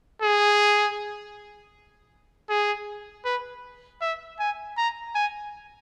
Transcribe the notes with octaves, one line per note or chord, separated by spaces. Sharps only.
G#4
G#4
B4
E5
G#5
A#5
G#5